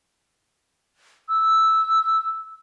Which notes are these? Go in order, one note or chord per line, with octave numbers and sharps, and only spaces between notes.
E6